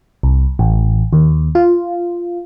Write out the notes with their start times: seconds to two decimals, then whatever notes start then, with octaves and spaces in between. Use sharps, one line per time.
0.23 C2
0.59 A1
1.13 D#2
1.55 F4